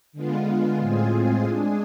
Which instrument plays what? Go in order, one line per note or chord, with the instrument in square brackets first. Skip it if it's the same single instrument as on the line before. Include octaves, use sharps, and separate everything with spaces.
[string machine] D3 G#3 B3 F4
A2 G#3 C4 F4 G#4
G#3 D4 G#4